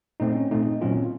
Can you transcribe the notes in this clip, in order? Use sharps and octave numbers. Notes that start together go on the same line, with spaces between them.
A#2 A3 C4 D#4
C#4
A#2 A3 C4 D#4
A#2 F#3 C4 C#4 F4